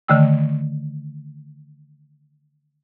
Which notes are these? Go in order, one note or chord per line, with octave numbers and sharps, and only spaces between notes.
D3 D#3 A3 G5 E6